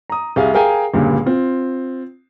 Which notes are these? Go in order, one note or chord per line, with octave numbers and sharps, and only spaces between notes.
A#5 D#6
C2 G#4 F5 G#5
G#4 A#4 F5 G5 G#5 A#5
C#2 G2 A#2 D3
C4 F4